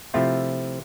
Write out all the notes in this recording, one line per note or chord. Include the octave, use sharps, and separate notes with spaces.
C3 F3 A3 C4 E4 F4